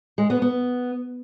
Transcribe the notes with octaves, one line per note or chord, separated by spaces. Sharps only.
G#3
B3
B3